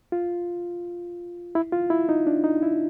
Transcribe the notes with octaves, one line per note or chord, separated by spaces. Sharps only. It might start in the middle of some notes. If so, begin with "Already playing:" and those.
F4
E4
F4
E4
D#4
D4
D#4
E4